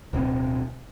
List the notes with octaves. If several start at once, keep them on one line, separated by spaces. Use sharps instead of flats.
D1 B2 B3 C4